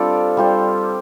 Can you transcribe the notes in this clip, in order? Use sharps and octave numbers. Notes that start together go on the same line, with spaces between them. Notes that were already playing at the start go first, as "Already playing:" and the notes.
Already playing: G3 C4 D4 F4 A4 D5
G3 F4 C5